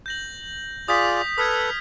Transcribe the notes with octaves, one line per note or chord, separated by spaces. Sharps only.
G6 A#6 F#7
F4 G#4 D5 D#6 G6 B6
A4 B4 B5 D#6 F6 G#6